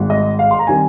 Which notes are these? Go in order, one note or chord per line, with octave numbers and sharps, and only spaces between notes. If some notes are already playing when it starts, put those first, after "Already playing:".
Already playing: G#1 G#2 G3
D#5
F5
C6
A#5
D#3 G3 C4 G#5